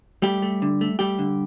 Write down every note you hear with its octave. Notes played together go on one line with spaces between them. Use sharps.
G3 A3 G4
A3
D3
A3
G3 A3 G4
D3